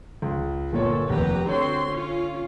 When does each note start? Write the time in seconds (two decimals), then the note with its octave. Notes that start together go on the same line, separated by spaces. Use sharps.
0.22 C#2
0.73 G1 A#2 A4 C#5
1.09 F1 D#2 G4 B4 A#5
1.47 D3 C4 F#4 C#5 C6
1.91 C#4 F4